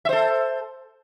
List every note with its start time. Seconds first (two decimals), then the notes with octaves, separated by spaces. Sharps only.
0.05 E5
0.09 C5
0.13 A4